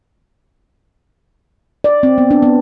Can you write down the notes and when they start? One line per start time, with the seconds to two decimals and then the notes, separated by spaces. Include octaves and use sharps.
1.84 D5
2.03 C4
2.18 B3
2.31 D4
2.43 B3